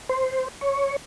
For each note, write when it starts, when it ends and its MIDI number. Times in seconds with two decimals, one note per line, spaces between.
0.09 0.48 72
0.61 0.96 73